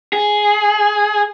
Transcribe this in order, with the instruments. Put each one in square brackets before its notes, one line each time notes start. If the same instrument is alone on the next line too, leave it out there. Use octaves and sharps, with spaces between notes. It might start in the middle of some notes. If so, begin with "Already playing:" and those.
[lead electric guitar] G#4